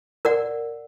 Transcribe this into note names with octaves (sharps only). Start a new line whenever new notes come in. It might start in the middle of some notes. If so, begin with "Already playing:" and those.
A#4 D5 F#5